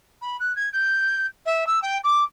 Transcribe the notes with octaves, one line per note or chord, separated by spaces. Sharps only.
B5
F#6
G#6
G6
E5
E6
G5
D6